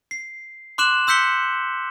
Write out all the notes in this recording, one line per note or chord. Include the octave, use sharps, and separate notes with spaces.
C7
C6 D6 F#6 E7 F#7
C6 E6 G6 B6 C#7 G7